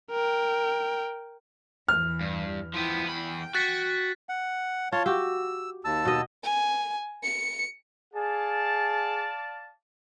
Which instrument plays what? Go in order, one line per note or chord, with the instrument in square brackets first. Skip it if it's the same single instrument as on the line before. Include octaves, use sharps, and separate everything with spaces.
[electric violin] A#4 G5
[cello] E2 E3 [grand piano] F6
[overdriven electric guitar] G2
[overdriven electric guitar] F3 B3 [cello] E4 G5
[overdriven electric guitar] E2 B5 [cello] G5
[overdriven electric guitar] F#4 [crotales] F#6 A6 B6
[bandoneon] F#5
[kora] F4 [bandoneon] C#5 A5
[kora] F#4 G4 [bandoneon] E6
[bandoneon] D#2 A5 E6
[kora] B2 D#5
[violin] G#5
C#7
[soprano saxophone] G#4 [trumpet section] D5 F5 A5